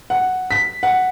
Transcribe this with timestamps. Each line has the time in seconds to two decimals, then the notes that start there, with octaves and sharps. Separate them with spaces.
0.10 F#5
0.51 B6
0.83 F#5